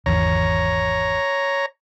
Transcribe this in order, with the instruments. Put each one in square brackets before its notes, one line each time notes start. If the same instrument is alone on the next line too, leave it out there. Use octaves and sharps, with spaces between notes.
[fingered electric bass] G#1 E2 D3 [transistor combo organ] C#5 A#5